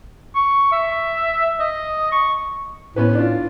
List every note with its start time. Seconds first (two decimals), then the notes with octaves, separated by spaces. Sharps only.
0.35 C#6
0.72 E5
1.60 D#5
2.12 C#6
2.96 A2 B3 C#4 B4
3.15 D4 F4